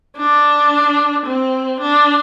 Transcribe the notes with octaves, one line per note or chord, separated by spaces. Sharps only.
D4
C4
D4